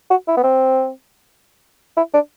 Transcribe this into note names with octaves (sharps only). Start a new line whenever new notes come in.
F#4
E4
B3
C4
E4
D4